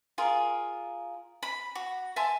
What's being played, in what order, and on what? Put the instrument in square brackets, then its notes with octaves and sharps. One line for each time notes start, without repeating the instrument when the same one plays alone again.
[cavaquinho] F4 G#4 A#4
B5
F#4
E5 G#5 A5 C6